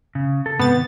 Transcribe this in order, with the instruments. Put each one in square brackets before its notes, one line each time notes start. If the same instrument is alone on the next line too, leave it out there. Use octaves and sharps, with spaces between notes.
[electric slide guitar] C#3
A4
[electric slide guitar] G#2 C3 [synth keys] B3 A6
[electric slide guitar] D#3